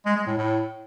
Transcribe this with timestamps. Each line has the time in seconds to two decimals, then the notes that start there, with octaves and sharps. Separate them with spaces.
0.06 G#3
0.16 G#3
0.27 A2
0.37 A2